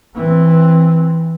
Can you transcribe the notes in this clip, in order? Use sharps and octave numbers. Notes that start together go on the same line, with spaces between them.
E3 C4